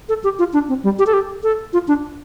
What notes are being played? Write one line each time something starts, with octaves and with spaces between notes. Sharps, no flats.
A4
G4
F4
D4
C4
G3
G4
A4
G4
A4
F4
D4